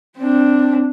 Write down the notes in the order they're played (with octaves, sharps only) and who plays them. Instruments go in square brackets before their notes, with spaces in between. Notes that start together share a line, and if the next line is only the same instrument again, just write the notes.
[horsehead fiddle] C4 D4